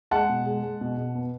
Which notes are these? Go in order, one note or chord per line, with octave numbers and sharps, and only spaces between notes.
G#3 F#5 A5
B2
G#3
G#3
B2
B2
B3